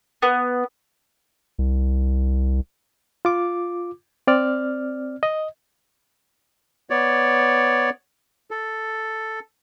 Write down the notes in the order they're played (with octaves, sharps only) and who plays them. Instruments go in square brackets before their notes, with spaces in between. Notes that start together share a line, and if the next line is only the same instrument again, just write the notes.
[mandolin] B3
[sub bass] C2
[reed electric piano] F4 D6
C4 D5 F6
D#5
[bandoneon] B3 C#5 D5
A4